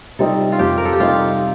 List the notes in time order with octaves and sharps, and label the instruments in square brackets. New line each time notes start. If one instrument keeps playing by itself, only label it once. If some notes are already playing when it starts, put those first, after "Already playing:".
[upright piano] C3 G3 C4 D#4 [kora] A4
[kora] F4
[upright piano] F2 [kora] G4
[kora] A#4
A4
G4
[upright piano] C3 G3 C4 D#4 [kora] F4